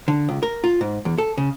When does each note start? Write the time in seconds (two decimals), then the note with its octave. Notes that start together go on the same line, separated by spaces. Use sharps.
0.08 D3
0.29 C#2
0.43 A#4
0.64 F4
0.81 G#2
1.05 E2
1.18 A4
1.38 C#3